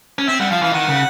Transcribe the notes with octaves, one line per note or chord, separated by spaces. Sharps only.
C#4
C4 E5
G3 F#5
F3 F5
E3 F5
D#3 F#5
C#3